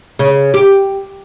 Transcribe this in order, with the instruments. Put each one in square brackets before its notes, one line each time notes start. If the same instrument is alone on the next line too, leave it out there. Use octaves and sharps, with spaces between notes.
[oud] C#3
G4